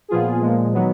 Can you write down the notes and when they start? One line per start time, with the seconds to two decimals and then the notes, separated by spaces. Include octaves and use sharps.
0.09 A#2 F3 B3 F4 G#4
0.41 A#2 F3 G#3
0.73 D#3 F#3 B3